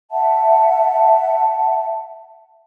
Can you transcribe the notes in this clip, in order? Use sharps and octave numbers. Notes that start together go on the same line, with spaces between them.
E5 F#5 A5